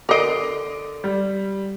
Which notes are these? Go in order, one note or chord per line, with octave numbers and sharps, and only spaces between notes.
D3 A#4 D#5 D6 C7 D7
G3